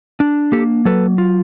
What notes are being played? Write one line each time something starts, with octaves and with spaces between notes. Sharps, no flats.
D4
A#3 G4 A4
F#3 A4 B4
F4